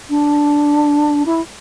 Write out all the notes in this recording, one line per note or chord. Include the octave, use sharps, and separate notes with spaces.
D4
E4